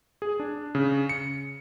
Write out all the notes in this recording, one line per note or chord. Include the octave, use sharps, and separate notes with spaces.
G#4
D4
C#3
C#7